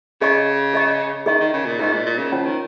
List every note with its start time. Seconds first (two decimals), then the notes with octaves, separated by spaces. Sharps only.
0.21 C#3 G#4 D#5 C#6
0.73 G#4 D#5 C#6
1.26 D#3 G#4 D#5 C#6
1.40 D#3
1.53 C#3
1.66 A#2
1.79 G#2 G#4 D#5 C#6
1.93 A#2
2.06 A#2
2.19 C#3
2.32 F3 C#4 F4 C#5 G#5
2.45 D#3